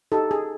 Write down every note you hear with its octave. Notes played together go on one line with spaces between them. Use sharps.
D#4 G4 A4
G#4